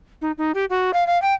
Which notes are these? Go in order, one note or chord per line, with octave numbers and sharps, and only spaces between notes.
D#4
D#4
G4
F#4
F5
F5
G5